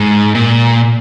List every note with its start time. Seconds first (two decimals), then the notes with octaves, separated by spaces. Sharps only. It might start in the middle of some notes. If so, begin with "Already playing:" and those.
Already playing: G#2
0.35 A#2